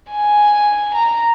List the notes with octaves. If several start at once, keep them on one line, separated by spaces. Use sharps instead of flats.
G#5
A#5